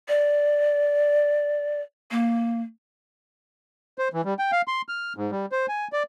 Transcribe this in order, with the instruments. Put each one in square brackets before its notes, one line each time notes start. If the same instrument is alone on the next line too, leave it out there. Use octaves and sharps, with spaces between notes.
[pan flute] D5
A#3
[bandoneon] C5
E3
G3
G5
F5
C6
F6
G#2
G3
C5
G#5
D5